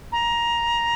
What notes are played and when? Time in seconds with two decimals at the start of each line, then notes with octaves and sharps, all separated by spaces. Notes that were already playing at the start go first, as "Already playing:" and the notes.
0.12 A#5